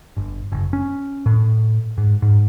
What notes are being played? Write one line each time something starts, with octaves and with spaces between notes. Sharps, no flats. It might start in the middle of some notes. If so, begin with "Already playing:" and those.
G1
F#1
C#4
A2
G#2
G#2